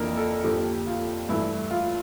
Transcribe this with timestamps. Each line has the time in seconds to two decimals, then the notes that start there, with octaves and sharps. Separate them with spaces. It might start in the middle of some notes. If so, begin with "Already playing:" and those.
Already playing: F2 E3 A#3 D4 A#4
0.17 A4
0.44 F2 D3 F3 A#3 G4
0.87 F4
1.29 G2 E3 A3 E4
1.71 F4